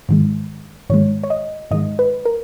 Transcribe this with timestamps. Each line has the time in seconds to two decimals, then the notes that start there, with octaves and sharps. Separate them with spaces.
0.09 G#2 D#3 G#3
0.90 G#2 D#3 G#3 C#5
1.24 C#5
1.30 D#5
1.71 G#2 D#3 G#3 D#5
1.99 B4
2.25 A#4